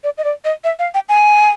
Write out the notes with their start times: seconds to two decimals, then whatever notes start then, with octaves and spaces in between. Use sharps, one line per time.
0.04 D5
0.18 D#5
0.24 D5
0.45 D#5
0.64 E5
0.79 F5
0.94 G5
1.09 G#5